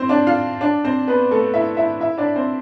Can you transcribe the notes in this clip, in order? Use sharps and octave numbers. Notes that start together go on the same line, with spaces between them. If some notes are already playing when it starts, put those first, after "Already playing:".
Already playing: C4 E4 C5
D4 D5
F4 F5
D4 D5
C4 C5
B3 B4
A3 A4
E4 E5
E4 E5
E4 E5
D4 D5
C4 C5